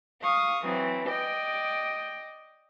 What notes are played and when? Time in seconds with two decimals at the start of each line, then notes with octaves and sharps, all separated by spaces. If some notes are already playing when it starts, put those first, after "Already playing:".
0.22 F5 C#6 D#6
0.64 E3 F#3 C4
1.07 D5 D#5 G5